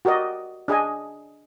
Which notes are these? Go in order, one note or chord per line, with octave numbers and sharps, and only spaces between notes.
F#4 G4 A#4 D5 D#5
D4 G#4 D#5 G#5